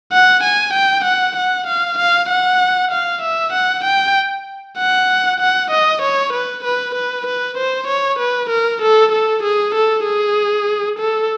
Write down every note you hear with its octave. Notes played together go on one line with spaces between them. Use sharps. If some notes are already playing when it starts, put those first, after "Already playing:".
F#5
G#5
G5
F#5
F#5
F5
F5
F#5
F5
E5
F#5
G5
F#5
F#5
D#5
C#5
B4
B4
B4
B4
C5
C#5
B4
A#4
A4
A4
G#4
A4
G#4
A4